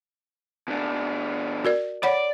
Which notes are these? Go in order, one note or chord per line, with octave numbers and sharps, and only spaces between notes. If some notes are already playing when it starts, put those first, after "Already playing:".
B2 D4
F#4 A#4 D5
C#5 D5 F#5 B5